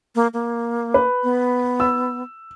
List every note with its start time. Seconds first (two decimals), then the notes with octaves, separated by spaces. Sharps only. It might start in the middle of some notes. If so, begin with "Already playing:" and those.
0.15 A#3
0.34 A#3
0.94 B4
1.24 B3
1.80 E6